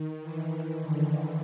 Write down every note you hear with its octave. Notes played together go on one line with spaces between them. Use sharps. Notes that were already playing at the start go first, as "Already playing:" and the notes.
Already playing: D#3
E3
D#3
D3